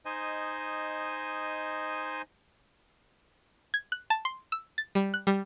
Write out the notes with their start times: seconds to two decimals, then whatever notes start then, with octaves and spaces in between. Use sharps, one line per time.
0.05 D#4 C5 D#5 G#5
3.74 G#6
3.92 F#6
4.10 A5
4.25 C6
4.52 E6
4.78 A6
4.95 G3
5.14 F#6
5.27 G3